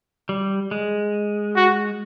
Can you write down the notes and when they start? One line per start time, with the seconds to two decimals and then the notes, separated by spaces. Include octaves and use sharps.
0.29 G3
0.71 G#3
1.56 F#4